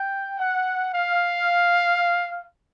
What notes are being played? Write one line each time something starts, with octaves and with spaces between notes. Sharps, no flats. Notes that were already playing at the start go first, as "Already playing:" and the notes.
Already playing: G5
F#5
F5